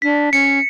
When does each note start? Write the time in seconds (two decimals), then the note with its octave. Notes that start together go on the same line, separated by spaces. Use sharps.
0.02 D4 B6
0.32 C#4 C#7